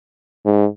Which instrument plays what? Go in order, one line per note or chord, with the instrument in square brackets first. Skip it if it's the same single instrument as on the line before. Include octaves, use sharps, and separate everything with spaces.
[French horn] G#2